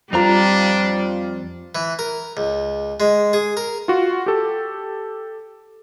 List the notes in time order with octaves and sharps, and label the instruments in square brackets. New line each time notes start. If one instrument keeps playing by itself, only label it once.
[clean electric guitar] F2 C4 A#5 [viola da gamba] G3 [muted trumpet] D4 [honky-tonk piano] F4 F7
[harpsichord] E3
A#4
C#2
G#3
G#4
A#4
[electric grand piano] F4 F#4
G4 A4